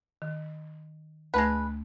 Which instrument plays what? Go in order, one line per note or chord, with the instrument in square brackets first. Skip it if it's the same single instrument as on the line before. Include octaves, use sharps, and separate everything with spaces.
[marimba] D#3
[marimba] D2 A3 A5 [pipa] G#3 B4